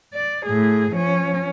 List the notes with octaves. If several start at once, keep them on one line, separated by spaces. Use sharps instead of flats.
D5
A2 G#4
F3 C#4